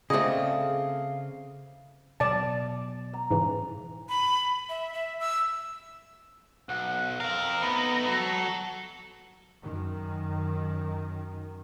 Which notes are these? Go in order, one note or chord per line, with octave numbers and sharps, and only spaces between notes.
C#3 A3 C4 G#4 D5 D#5 F5
B2 F#3 D5 A5
A#5
G#2 C#3 E3
B5
E5
E5
E6
B1 F#5
C4 A#4 F5 A#5
A3 B3 D#4
F#3 A4
F#2 D#3